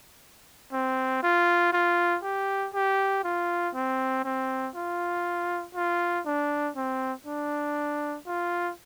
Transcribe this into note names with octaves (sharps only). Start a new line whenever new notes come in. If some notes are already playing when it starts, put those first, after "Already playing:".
C4
F4
F4
G4
G4
F4
C4
C4
F4
F4
D4
C4
D4
F4